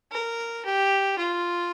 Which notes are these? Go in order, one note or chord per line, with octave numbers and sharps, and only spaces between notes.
A#4
G4
F4